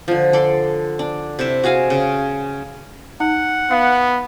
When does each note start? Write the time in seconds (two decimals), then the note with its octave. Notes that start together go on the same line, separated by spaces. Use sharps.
0.08 D3 F3
0.33 A4 D5 C6
0.99 D4
1.39 C3 E4 E5
1.64 F#4 G#4 F5 G#5
1.90 C#3
3.20 D#4 F#5
3.71 B3 F5